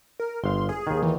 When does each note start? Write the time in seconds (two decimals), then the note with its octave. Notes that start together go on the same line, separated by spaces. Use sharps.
0.20 A#4
0.44 G1 F5 C6
0.69 G#4
0.87 D#2 D#3
1.02 E3